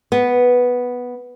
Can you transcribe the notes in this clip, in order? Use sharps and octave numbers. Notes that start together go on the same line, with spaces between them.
B3